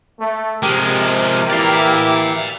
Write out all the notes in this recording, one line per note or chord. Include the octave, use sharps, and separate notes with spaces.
A3
C3 F3 G#3 G4 A#4
E3 A#3 E4 D5 F5